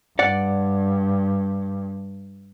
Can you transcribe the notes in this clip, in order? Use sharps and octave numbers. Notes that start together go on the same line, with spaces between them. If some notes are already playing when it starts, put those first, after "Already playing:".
G2 D5 F#5